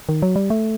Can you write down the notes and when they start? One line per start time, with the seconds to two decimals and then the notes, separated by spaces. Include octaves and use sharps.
0.09 D#3
0.22 F#3
0.36 G3
0.50 A3